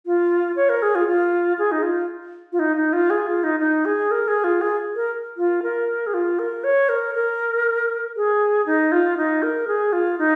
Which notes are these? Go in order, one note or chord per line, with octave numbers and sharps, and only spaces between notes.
F4
C#5
A#4
G#4
F4
F4
G#4
D#4
F4
F4
D#4
D#4
F4
G#4
F4
D#4
D#4
G#4
A#4
G#4
F4
G#4
A#4
F4
A#4
G#4
F4
A#4
C#5
A#4
A#4
G#4
D#4
F4
D#4
A#4
G#4
F4
D#4